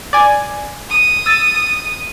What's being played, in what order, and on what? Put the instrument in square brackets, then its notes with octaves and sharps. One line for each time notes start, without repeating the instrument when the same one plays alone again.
[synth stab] D5 G#5
[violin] D#6
[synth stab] E6 A6